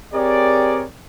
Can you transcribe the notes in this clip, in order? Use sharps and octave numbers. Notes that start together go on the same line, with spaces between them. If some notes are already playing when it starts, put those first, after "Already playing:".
C4 G4 G#4 A#4 C#5 D5